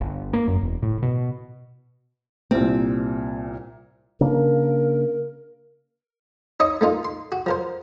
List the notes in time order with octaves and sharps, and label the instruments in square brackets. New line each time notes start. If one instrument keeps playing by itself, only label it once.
[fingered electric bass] G1
A#3
F#2
E1
A2
B2
[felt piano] C2 A#2 [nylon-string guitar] C4
[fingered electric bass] C#3 A#3 D4 [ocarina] A#4
[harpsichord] D#4 C#5 D#5 C#6 D#6
A3 A#3 D#4 F4
C6
F#4
F3 A#4 C5